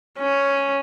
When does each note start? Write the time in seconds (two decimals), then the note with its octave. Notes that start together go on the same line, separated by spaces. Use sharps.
0.19 C#4